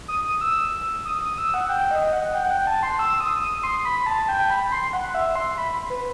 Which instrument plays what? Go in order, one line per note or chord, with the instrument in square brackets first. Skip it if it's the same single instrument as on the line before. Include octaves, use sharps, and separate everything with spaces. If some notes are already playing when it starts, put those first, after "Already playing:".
[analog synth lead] D#6
D#6
E6
D#6
D#6
E6
F#5
G5
D#5
F#5
G5
F#5
G5
A5
C6
E6
D#6
D#6
C6
B5
A5
G5
B5
C6
F#5
E5
C6
B5
B4